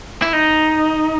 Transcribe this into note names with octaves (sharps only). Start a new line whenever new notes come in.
E4
D#4